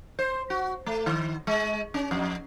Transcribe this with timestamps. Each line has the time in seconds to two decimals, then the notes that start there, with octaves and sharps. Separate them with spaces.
0.19 C5
0.50 F#4
0.86 A3
1.06 D#3
1.47 G#3
1.94 C#4
2.11 F2